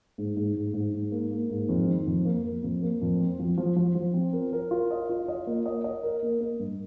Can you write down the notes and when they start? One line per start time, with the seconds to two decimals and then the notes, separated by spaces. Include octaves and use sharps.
0.18 G#2
0.37 G#2
0.55 G#2
0.74 G#2
0.94 G#2
1.12 A#3
1.30 A#3
1.50 G#2
1.69 F2
1.87 D#3
2.07 F2
2.25 A#3
2.44 A#3
2.63 F2
2.83 A#3
3.02 F2
3.21 C4
3.39 F3
3.58 F3
3.76 F3
3.95 F3
4.14 C4
4.33 A#4
4.53 A#4
4.71 F4
4.91 D#5
5.09 F4
5.28 D#5
5.47 A#3
5.66 D#5
5.84 D#5
6.03 A#4
6.22 A#3
6.41 A#3
6.59 G2